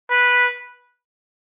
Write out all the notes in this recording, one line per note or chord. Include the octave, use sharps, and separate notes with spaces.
B4